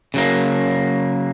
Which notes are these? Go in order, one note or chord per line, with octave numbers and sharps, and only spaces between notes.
C#3 F#3 A#3